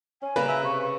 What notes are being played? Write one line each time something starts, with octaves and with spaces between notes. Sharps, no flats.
C#4 G#5
C#3 G3 A#3 B4 A#5
E5
C3 C#6
C#6